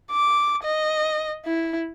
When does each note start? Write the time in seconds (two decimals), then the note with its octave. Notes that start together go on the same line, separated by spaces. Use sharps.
0.12 D6
0.64 D#5
1.45 E4